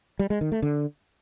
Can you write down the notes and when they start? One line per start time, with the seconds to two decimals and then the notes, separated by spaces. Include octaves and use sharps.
0.19 G3
0.30 G#3
0.41 D#3
0.52 A3
0.62 D3